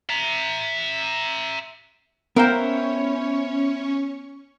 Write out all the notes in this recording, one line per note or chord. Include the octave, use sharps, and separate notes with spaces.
E5 A#5
B3 C#4 E4 A#4 C5 C#5 F5 G5